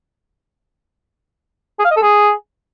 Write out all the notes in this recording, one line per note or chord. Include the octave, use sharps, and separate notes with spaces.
G#4
F5
D#5
A4
G#4